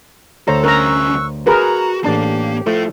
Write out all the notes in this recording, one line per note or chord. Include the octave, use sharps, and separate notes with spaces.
D2 A4 C5 C#5 A#5
C2 C#4 A#4 A#5 C#6 E6 F#6
F#4 G#4 A#4 B4 A#5
A1 A#3 D4 G4 A5
F3 A3 E4 A4